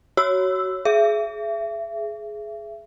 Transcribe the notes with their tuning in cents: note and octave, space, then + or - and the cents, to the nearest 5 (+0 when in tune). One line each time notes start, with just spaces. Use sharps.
F#4 +20 C#5 +0 E6 +0
G#4 +20 E5 +30